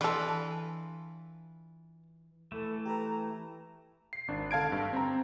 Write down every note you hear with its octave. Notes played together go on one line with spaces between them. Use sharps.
D3 E3 F4 A4 B4
E3 A3 A4
G4 A4 B4 A#5
C7
G#1 D4
D3 F5 A5 G#6 D7
G2
C4 A#5